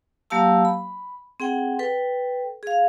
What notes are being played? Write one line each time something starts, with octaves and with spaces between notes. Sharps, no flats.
F#3 A#3 G4 F5 A5 E6
B5
C4 G#4 F#5 G5
A4 B4 G5
G#4 F5